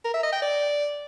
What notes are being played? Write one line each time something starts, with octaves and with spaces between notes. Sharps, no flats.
A#4
E5
D#5
G5
D5